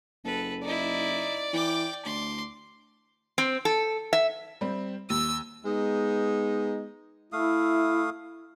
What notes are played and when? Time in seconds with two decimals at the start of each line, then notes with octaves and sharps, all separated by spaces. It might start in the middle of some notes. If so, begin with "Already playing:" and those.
0.24 F#1 A4 B4
0.63 D#4 E4 D5
1.53 E3 G5 D6
2.05 D2 C6 D6
3.38 C4
3.65 A4
4.13 E5
4.61 G3 C4
5.10 D#2 E6
5.65 G#3 B3 D#4
7.33 A3 E4 F5 D#6